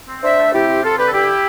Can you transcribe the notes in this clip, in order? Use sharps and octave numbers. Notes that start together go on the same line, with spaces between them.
C4
D4 C5 E5
A3
C3 E4 G4
C4
C4 F4 A4
D3 G4 B4
A4
G2 E4 G4